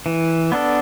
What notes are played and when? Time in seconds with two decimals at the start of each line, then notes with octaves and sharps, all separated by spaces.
0.06 E3
0.52 B3 D4 A4